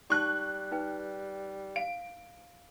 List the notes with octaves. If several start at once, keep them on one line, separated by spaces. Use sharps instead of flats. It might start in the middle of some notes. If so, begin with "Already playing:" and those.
G3 D#4 A5 C#6 F#6
D#4 B4 G5
F5 D7